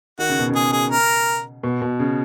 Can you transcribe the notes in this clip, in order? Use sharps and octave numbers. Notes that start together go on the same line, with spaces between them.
D#3 F#4
C#3
B2
C#3
G#4
G#4
A#4
B2
B2
C#3